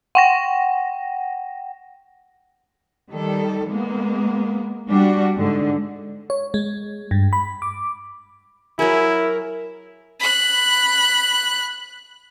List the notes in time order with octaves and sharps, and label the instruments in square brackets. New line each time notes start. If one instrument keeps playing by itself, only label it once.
[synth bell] F#5 G5 A#6
[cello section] D#3 G3 A4
G#3 A#3 B3
G3 D4 F#4
G#2 D3
[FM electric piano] C#5
G#3
G2
B5
D6
[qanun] F#3 G#4 [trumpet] E4 [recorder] A#4
[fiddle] B5 F#6